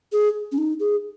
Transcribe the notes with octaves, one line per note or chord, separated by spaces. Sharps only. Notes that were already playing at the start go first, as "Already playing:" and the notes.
G#4
C#4
D#4
G#4